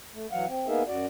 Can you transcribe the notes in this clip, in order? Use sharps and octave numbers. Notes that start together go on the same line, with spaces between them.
A3
E3 F#3 F5 F#5
C4
A#3 B3 D#4 G#4 A#4 E5
F#2 F#4 D5